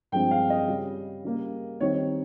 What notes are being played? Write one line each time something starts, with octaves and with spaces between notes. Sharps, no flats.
G2 F3 G#3 C4 G5
F5
D#5
C#3 G3 C#4
C#3 G3 A#3
D#3 G3 C4 D#4 C#5